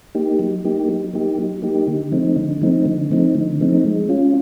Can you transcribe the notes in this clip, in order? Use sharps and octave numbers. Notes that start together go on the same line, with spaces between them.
A#3 D#4 G4
F#3
A#3 D#4 G4
F#3
A#3 D#4 G4
F#3
A#3 D#4 G4
D3
F3 A3 C4 D#4
D3
F3 A3 C4 D#4
D3
F3 A3 C4 D#4
D3
F3 A3 C4 D#4
G#3
C#4 F4